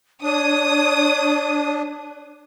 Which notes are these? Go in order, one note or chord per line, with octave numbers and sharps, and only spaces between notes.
D4 C#5 D#6